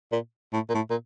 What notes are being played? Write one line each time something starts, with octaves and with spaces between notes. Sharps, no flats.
A#2
A2
A#2
A2
A#2